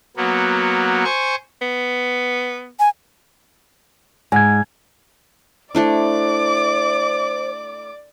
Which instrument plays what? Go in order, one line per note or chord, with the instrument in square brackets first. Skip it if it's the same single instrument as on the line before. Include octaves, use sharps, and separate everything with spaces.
[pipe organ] F#3 A#3 B3
C5 G#5 C#6
[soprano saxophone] B3
[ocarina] G#5
[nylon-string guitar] G#2 [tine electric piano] G#5 G#6
[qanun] A3 D4 E4 [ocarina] C5 [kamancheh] D5 D6